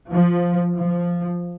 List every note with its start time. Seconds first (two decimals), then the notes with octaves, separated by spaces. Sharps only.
0.10 F3
0.76 F3